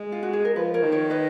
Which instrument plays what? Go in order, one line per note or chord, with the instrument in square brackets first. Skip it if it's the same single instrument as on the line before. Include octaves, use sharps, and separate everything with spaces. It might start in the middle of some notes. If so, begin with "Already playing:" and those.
Already playing: [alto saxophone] G#3
[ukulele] F4
F#4
G#4
A#4
[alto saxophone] F3 [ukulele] B4
[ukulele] A#4 C#5
[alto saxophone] D#3
[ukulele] A#4 C#5
B4 D#5